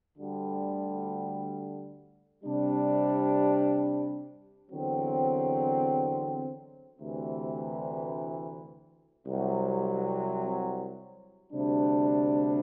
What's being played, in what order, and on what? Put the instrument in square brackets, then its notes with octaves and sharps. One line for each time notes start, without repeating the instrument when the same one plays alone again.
[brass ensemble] D2 D3 G3
C3 G3 D4
E2 D3 F#3 C4
D2 C3 E3
C2 C3 F#3
D2 C3 G3 D4